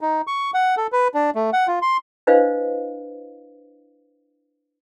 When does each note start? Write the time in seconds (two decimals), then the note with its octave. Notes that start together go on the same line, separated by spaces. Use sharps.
0.01 D#4
0.27 C#6
0.54 F#5
0.77 A4
0.92 B4
1.14 D4
1.35 A3
1.53 F#5
1.68 F4
1.82 C6
2.27 D4 E4 B4 C5 D#5 F5